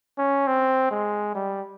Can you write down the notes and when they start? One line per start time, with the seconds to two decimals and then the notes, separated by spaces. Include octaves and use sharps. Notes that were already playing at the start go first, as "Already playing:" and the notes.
0.18 C#4
0.47 C4
0.91 G#3
1.35 G3